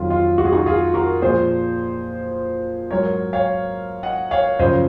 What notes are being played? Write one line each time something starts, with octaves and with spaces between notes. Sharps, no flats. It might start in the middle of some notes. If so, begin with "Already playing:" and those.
Already playing: F2 D#3 F#3 F4
F4
F#4
G#4
D#4 F#4
F4 G#4
F#4 A#4
A#2 F3 G#4 C5
G#2 F#3 A#4 C#5
C#5 F5
D#5 F#5
C#5 F5
F#2 C#3 F3 C5 D#5